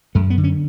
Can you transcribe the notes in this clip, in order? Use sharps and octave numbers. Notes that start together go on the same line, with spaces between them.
F#2 A3
B3
D3
C#4